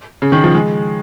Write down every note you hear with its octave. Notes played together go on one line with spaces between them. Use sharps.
C#3
D#3
F3
G#3